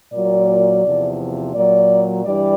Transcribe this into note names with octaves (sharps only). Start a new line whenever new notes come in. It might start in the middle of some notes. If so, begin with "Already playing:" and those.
A#2 F#3 D5
E2 C3 F3
A#2 F#3 D5
G2 E3 G3 D5